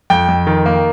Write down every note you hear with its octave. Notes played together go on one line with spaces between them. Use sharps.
F2 G5
F2
D#3
A#3